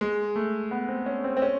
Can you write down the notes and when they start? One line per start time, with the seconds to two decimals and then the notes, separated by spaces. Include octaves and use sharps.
0.01 G#3
0.36 A3
0.71 B3
0.89 C4
1.06 C#4
1.24 C4
1.37 C4
1.42 C#4